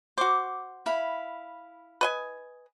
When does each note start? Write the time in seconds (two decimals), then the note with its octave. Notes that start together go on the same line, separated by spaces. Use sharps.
0.18 F#4 C5 D6
0.86 E4 F5 B5
2.01 B4 D#5 G#5